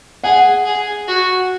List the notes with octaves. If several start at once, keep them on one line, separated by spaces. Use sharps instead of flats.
G#4 F#5
G#4
F#4